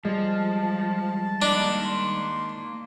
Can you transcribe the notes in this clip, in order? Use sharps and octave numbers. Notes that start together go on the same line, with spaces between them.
F3 G3 G#3 A5
A#3 D4 D#5
C6